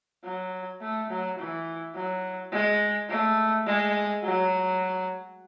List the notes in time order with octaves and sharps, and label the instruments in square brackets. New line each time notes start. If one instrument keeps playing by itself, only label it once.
[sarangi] F#3
A3
F#3
E3
F#3
G#3
A3
G#3
F#3